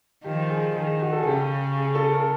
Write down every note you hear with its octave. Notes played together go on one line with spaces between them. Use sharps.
D#3 F3 G4
G#4
D#3 G#4
F#4
A4
G#4
C#3 G4
G#4
A4
A#4